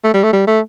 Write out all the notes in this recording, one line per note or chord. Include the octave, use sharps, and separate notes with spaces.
A3
G3
A3
G3
A3